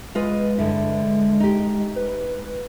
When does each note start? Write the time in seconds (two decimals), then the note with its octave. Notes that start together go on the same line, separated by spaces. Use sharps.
0.15 G#3 F4 B4 D#5
0.58 G2 D3 E4
1.40 D#4 G4
1.96 B4